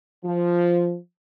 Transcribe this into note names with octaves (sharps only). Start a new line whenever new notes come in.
F3